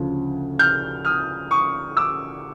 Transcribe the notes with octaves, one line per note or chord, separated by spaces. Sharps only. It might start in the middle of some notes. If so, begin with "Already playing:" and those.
Already playing: D2 C#3 F3
F6 G6
D#6 F6
C#6 D#6
D6 E6